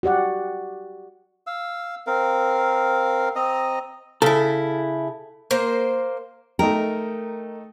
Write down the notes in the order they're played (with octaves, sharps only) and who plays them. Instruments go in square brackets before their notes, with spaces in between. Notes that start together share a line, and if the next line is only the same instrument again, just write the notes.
[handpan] F#4 G4 D5 F#5
[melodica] F5 E6
C4 A#4 F5
C4 D#5 A#5 D#6
[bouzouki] C#3 E4 [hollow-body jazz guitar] A4
[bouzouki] A#3 C5
[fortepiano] A3 D#4 G5 [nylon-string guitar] A#4